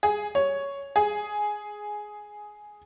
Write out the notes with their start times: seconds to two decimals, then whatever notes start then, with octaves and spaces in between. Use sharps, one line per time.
0.03 G#4
0.35 C#5
0.96 G#4